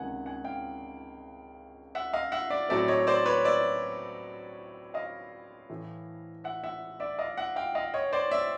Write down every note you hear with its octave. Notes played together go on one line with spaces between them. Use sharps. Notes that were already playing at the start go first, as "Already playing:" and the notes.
Already playing: C#2 C3 D#3 F#5 G#5
F#5 G#5
F5 G5
E5 F#5
D#5 F5
E5 F#5
D5 E5
A2 F#3 A3 C4 D5 E5
C#5 D#5
C5 D5
B4 C#5
D5 E5
D#5 F5
A2 E3 A3
E5 F#5
E5 F#5
D5 E5
D#5 F5
E5 F#5
F5 G5
D#5 F5
C#5 D#5
C5 D5
D5 E5